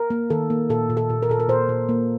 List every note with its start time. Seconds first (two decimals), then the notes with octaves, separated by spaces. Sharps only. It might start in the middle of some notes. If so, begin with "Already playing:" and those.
Already playing: A#4
0.10 A#3
0.30 D#3 A4
0.50 A#3
0.70 A#2 A4
0.90 A#2
0.97 A4
1.10 A#2
1.23 A#4
1.29 A#2 A4
1.40 A#4
1.49 A#2 C5
1.69 A#2
1.89 A#3